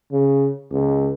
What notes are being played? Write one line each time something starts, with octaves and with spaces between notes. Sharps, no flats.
C#3
C#2